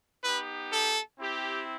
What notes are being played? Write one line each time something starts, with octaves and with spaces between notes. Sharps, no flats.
B3 D#4 G4 B4
A4
C4 E4 G4